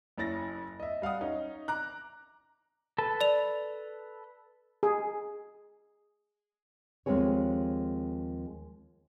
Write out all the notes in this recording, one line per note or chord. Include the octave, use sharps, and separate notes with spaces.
F#1 C#4 E4 A6 A#6
D#5 E5
G3 F5 F#5 D#6
C#4 D#4
A#5 D6 F#6
A4 B4 A5
D5 F7
G#4
D#2 F3 G#3 C4 G#4 C#5